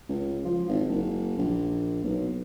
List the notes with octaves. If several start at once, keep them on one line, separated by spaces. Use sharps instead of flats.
C#2
F3
G#1
F#1
A#1
B1